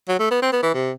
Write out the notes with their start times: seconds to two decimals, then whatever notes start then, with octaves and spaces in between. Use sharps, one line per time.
0.08 F#3
0.19 A3
0.31 B3
0.42 C4
0.52 B3
0.63 E3
0.74 C3